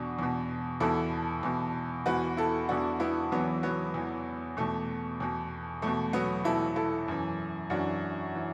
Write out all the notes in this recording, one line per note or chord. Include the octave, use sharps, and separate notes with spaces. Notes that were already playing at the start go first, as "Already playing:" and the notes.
Already playing: E2 B2 D4 F#4
E2 B2
E2 B2 E4 A4
E2 B2
E2 E3 F#4 B4
E4 A4
E2 E3 D4 F#4
B3 E4
E2 E3 F#3 B3
F#3 B3
E2 E3
E2 B2 A3
E2 B2
E2 B2 A3
F#3 B3
E2 B2 E4 A4
E4 A4
F#2 E3
F#2 E3 D4 F#4
E3